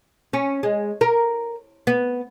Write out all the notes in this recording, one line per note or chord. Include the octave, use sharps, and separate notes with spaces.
C#4
G#3
A#4
B3